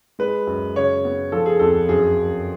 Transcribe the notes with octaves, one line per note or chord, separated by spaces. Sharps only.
G#3 B4
F#2
C#3 C#5
B3
F3 A4
G#4
F2 A4
F#2 G#4
F#2